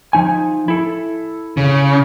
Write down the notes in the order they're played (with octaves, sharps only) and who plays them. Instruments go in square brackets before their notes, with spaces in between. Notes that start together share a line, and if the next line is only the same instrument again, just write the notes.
[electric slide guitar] F3 D#4 G#5
E4 A4
[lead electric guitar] C#3